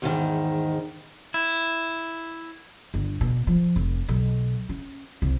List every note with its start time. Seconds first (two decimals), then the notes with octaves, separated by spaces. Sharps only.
0.02 E2 G#2 D#3
1.34 E4
2.94 G1
3.21 B2
3.47 F3
3.76 F1
4.08 B1
4.69 C#4
5.22 C2